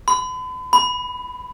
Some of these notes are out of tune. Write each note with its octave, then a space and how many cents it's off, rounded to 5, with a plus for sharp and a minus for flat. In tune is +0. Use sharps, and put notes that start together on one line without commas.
B5 +40
B5 +5